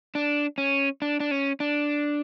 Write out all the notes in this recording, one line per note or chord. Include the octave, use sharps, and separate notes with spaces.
D4
C#4
D4
D4
C#4
D4